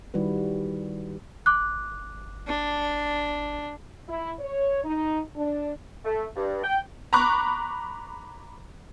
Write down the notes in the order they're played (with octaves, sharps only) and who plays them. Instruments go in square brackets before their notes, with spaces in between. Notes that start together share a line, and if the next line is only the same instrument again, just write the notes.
[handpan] D#3 G3 E4 F#4 B4
[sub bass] G1 [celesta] D6 F#6
[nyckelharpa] D4
[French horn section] E4
C#5
D#4
D4
[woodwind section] A3
G2
G5
[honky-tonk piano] A#5 B5 C#6 D6 F#6